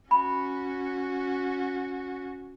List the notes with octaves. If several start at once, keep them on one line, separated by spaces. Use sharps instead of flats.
C#4 F#4 B5